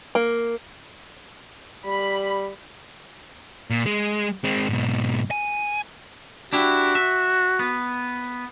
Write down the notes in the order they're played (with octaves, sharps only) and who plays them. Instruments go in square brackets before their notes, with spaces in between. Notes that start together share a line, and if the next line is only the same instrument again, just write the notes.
[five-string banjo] A#3
[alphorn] G3 [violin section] B5
[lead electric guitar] A#2
G#3
G#3 C4
G#2 B2
G#5
[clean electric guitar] D4 E4 G4 [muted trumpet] F#4
[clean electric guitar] E5
B3